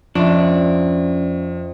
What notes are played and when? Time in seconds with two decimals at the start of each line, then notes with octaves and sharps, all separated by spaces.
0.15 F2 F3 C#4 D4 E5 C6